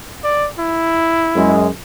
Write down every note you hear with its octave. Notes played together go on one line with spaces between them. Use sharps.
D5
E4
F#2 G#3